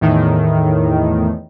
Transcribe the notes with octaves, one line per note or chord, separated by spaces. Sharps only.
E2 A2 D#3